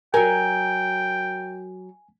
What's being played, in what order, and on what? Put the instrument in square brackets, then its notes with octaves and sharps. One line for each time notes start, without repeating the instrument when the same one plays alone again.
[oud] F#3 A#4 [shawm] G5 [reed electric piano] G#5